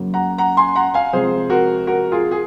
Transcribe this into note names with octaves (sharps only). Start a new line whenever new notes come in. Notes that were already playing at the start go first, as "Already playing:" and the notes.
Already playing: F#2 C#3 F#3 A#3
F#5 A#5
F#5 A#5
G#5 C6
F#5 A#5
F5 G#5
C3 F3 G#3 G#4 C5
F#4 A#4
F#4 A#4
F4 G#4
G#4